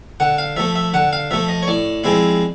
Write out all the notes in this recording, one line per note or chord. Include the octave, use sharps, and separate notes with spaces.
D3 F#5
F5
F3 A3 E5
E5
D3 F#5
F5
F3 A3 E5
D#5
C#5
A2 D5
F3 G#3 C4 E4